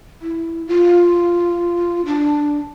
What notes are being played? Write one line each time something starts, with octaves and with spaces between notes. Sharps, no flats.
E4
F4
D4